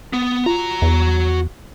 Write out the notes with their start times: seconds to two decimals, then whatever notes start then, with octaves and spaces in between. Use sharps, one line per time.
0.13 B3
0.46 F4 F#4 A#5
0.82 E2